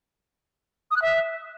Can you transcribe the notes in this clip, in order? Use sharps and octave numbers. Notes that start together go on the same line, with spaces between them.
D#6
F#6
E5